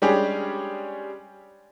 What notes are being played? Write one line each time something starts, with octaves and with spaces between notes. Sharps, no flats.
G3 G#3 C#4 D4 G4 G#4